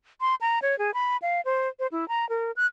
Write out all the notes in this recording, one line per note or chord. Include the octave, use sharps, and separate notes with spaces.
C6
A#5
C#5
G#4
B5
F5
C5
C5
E4
A#5
A#4
F#6